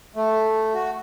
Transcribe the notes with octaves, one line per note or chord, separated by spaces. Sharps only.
A3
F#4